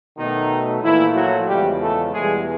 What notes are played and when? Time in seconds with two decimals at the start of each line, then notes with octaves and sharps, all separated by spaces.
0.17 B2 D#3 F#3 A3 D#4
0.82 A#2 E3 F3 A3 E4
1.15 F#3 F#4
1.48 E2 C#3 F3 G3 G#3 G4
1.80 A3 A4
2.13 E2 B2 G3 G#3 G#4